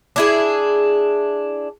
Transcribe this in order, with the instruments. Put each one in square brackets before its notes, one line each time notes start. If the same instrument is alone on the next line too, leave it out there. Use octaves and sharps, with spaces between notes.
[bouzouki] D4 E4 G#4